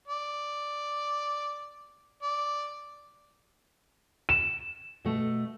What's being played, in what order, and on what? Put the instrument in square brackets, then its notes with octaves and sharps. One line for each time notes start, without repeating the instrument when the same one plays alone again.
[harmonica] D5
D5
[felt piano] E7
[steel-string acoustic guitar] B2 A3